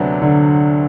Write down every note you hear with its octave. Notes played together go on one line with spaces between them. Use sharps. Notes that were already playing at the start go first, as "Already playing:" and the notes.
Already playing: D2 C3 F#3 B3 D4
D3